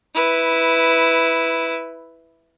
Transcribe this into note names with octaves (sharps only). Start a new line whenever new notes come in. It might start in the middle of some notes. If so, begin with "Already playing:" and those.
E4 B4